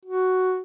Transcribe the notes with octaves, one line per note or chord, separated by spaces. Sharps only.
F#4